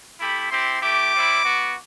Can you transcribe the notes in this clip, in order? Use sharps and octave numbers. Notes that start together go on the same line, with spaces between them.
A3 E4 G4 B5
C4 E4 G4 C6
A3 E4 G4 D6
G3 C4 E4
B3 F#4